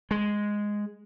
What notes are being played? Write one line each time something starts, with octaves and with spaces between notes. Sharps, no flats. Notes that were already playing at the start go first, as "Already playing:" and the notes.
G#3